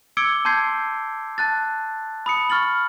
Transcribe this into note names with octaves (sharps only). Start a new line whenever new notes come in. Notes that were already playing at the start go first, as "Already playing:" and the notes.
D6 E6 G#6 C#7 D7 G7
A5 C6 G6 G#6 C7
A5 F#6 A6
B5 D#6 C#7
C#6 F6 A6 F#7